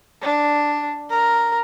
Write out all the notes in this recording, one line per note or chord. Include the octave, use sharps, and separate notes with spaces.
D4
A#4